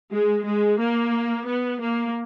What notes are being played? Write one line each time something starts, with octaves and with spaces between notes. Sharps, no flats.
G#3
G#3
A#3
B3
A#3